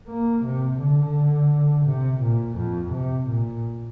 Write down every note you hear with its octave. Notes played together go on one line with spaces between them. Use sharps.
A#3
C3
D3
C3
A#2
F2
C3
A#2